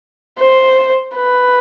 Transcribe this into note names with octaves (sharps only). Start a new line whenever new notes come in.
C5
B4